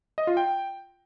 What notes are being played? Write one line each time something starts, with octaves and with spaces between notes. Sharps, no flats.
D#5
F4
G5